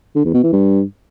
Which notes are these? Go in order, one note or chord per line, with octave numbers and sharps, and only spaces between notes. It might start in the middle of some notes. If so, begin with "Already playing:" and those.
D3
E2
B2
E3
G2